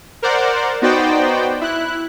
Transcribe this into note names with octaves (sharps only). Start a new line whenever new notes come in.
A#4 C5 D5 F#5
B3 D#4 F#4 C5 D5 G5
E4 F#6